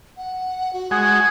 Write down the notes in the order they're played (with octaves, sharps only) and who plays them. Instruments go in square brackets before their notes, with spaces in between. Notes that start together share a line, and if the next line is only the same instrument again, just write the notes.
[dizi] F#5
F#4
[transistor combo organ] G#3 F#4 [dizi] D#6 [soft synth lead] G#6